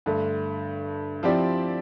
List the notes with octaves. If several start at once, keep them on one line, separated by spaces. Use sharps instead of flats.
G2 D3 A3
F3 C4 E4 G4 D5